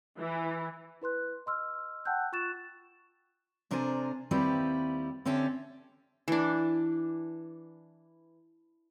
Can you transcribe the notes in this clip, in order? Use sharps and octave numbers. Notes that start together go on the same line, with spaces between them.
E3
E4 B4 C6 F#6
D#5 C6 E6 F6
F#5 G5 A5 E6 F#6 G6
F4 C#6 F#6 A6 E7
C3 D4 A4 A#4 C5 G#5
D#2 G3 C4 E4 G4 B4
D3 C4 C#4 G4 E5 A5
E3 D4